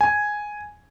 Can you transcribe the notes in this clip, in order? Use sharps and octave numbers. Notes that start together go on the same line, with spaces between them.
G#5